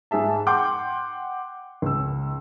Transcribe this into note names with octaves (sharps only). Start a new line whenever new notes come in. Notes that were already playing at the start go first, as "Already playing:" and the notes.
G#2 G#4 E5 A5
F#5 G5 C6 D6 G6
C#2 E6